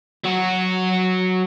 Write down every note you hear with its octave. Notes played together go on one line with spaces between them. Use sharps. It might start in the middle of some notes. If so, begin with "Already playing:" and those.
F#3 F#4